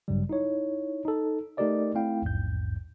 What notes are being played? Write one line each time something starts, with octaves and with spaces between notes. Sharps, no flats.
A1 G2 C#3 F#3 G3
D#4 E4 C#5
D#4 A4
A3 D#4 G4 A#4 D5 D#5
A3 C4 E4 F5 G5
A#1 E2 G#2 G6